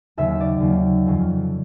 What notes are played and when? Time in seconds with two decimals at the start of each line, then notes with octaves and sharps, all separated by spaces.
0.17 D#2 C#3 F#3 E5
0.40 D5
0.60 D#2 C#3 F#3
1.06 F2 C#3 F3